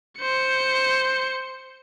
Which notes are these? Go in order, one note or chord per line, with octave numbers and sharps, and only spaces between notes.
C5 C#7